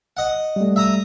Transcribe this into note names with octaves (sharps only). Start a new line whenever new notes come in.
D#5 F#5
G3 A3
E5 A#5 D#6